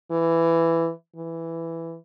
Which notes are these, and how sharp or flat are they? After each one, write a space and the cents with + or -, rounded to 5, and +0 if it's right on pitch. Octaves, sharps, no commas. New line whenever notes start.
E3 +10
E3 +5